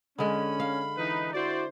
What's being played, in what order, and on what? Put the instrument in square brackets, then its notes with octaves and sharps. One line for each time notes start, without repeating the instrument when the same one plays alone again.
[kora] D3 G#3 [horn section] C#4 [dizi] B5
[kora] F5
[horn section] E3 D#4 B4
[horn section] E4 C5 D5 [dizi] F#4